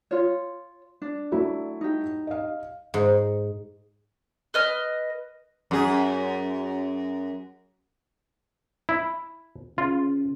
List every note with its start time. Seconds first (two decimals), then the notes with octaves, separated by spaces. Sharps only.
0.11 F4 C#5
1.02 D4
1.32 F#3 A3 E4
1.81 D#4 G4
2.27 D#5 F5
2.94 G#2
4.54 B4 D#5 F6
5.71 F#2 G#4
8.89 E4
9.78 C#3 F4